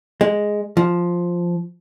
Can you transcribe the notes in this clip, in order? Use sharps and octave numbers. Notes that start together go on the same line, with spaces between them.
G#3
F3